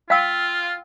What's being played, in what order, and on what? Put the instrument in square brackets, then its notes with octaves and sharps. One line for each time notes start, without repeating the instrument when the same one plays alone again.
[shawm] F4 [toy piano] F5 G5 E6